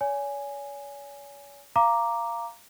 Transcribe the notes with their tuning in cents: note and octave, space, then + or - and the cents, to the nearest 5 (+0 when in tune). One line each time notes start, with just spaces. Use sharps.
C#5 +40 G#5 +0
F5 -20 A#5 +0 D6 +0